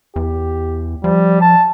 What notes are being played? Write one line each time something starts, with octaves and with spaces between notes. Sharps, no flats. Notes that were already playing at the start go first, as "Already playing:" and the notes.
E2 G4
F3 G3
A5